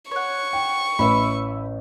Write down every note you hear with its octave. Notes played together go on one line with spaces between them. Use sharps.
C#5 F#5 C#6
G5
A1 C#4 B4 E5 B5